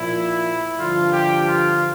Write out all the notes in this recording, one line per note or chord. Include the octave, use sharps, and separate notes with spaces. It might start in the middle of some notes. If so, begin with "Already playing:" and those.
Already playing: A#2 F3 E4
G2 D3 F3 F4
G4
F4